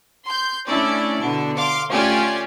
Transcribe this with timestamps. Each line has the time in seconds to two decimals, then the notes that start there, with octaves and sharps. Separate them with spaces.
0.25 C6 G6
0.67 A3 C#4 D4 E4 D5
1.19 B2 D3 D4
1.57 F5 C6 D6
1.89 A3 C#4 F4 G4 D5 G#5